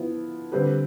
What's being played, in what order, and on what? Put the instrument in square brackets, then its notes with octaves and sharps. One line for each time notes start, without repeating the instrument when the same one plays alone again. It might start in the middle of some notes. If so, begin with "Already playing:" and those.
Already playing: [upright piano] F3 B3 E4
D3 G3 C4 G4 B4